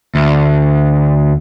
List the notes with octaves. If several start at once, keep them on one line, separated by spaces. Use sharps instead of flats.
D2